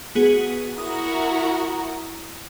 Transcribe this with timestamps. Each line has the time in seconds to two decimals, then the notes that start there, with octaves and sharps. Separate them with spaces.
0.15 B3 F#4 G#4
0.78 E4 F#4 A#4 D#6